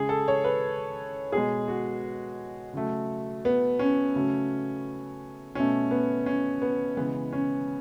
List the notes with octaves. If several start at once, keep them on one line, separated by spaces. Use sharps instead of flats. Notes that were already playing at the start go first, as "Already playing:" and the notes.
Already playing: C#3 G#3 G#4
A4
C#5
B4
B2 G#3 G#4
F#4
C#3 F#3 A3
B3
C#4
C#3 F#3 A3
B2 A3 C#4
B3
C#4
B3
C#3 E3 G#3 B3
C#4